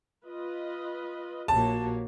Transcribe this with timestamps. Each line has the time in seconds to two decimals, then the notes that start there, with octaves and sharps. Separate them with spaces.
0.25 F4 B4 D#5
1.48 A#1 A#3 F#4 G4 C#5 A5